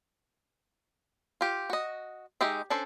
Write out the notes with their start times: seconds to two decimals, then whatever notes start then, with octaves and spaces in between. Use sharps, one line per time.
1.41 F4 G4
1.70 F#4 D#5
2.41 G#3 D#4 G4 D#5 E5
2.70 C#4 D4 A4 C5